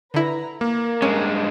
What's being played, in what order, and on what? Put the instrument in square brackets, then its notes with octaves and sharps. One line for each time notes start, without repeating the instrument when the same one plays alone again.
[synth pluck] D3 E4 [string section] B4 A#5 B5
[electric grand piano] A#3 [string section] A#4
[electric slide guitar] G2 G#3 [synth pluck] C#4